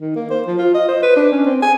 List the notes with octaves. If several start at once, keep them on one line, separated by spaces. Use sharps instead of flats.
D#3
A#3
C5
F3
F4
D#5
C5
B4
D4
C#4
C4
G#5